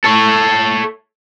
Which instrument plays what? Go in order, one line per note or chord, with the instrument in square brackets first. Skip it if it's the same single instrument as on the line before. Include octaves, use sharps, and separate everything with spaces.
[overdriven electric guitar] A4 C#5